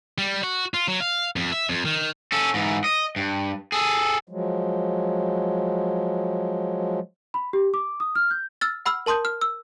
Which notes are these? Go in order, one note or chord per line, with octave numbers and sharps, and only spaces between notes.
G3
F#4
F4
F#3
F5
F2
E5
F2
D#3
C#4 A4
G#2 E3
D#5
G2
G#4 A4
F3 F#3 G#3
B5
G4
D6
D#6
F6
G6
E6 F6 A6
F#5 B5 E6 F6
A#4 A5 C6 D#6 G6
F6
E6